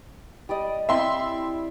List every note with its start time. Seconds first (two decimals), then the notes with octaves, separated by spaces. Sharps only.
0.49 G3 D5 D#5
0.89 C4 E4 E5 C6